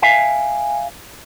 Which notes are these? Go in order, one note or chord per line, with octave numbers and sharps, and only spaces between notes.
E5 F5 G#5